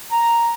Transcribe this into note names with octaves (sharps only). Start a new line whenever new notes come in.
A#5